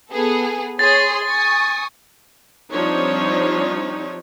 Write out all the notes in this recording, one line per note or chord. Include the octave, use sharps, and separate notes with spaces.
B3 G#4 A4
G#4 C#5 C6 A6
G#5 C#6 D#6
F3 G3 C4 D4 D#4 C#5